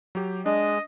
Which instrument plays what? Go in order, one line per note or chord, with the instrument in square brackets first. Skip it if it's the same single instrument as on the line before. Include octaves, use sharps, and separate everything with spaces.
[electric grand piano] F#3 G4
[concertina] G#3 [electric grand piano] D4 [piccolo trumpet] D#5